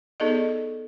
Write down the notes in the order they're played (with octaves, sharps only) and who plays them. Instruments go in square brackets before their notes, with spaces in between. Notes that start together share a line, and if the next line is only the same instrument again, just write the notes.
[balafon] B3 D#4 G#4 A4 D5 D#5